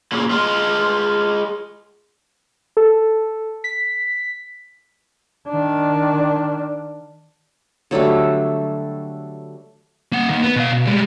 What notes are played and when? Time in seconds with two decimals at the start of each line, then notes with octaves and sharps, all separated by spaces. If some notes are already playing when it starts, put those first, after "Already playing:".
0.12 A#2 C#3
0.31 G#3 F4
2.77 A4
3.64 B6
5.49 D#3 D4
7.91 D3 F#3 G3 A3
10.12 A#3 F#5
10.29 D#3 A#3
10.43 B3
10.56 B2 F5
10.72 B2
10.86 G3 G#3